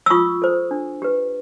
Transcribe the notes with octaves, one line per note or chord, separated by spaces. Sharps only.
E6
F4 C#6 D#6
A4 C5
D4
G4 B4